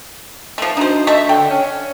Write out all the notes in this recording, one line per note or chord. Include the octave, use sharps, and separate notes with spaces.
F3 A3
D4 D#4 F#4 C5
A3 D#5 E5 C#6
D3 G5
C#4